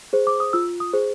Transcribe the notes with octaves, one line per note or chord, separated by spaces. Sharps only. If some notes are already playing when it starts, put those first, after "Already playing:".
G#4 C5
D6
D#6
F4 E6
D#6
G#4 C5